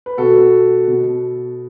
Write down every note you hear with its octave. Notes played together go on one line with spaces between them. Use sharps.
B4
B2 F#4 A4
B2